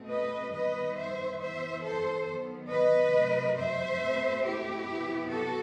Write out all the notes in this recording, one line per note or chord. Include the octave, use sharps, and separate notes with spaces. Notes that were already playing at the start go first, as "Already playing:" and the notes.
Already playing: B2 A3 C4
B4 D#5
D#3 G3 B3 B4 D#5
C5 E5
E3 B3 C5 E5
A4 C5
D#3 F#3 B3
B4 D#5
C3 F#3 A3
C5 E5
B2 A3 C4
E4 G4
C3 F#3 B3
F#4 A4